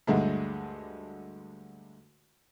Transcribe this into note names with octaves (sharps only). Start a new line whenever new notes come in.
D2 G2 D3 G#3 A3